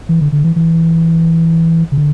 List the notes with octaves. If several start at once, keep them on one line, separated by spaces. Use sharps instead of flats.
E3
D3
D3
E3
E3
C#3
D3